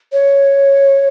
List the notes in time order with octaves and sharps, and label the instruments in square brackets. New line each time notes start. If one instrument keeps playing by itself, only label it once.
[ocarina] C#5